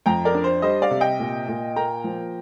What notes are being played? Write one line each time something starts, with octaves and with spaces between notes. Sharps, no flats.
F2 G5 A#5
A#4 D5
D4
C5
G3 C5 D#5
D5 F5
C3
D#5 G5
A#2
A#2
A#3 G5 A#5
F3